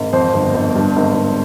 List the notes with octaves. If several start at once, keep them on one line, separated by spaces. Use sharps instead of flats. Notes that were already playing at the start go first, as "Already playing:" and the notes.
Already playing: G#1
F2 C5
G1
G1
G2
G#1
G#1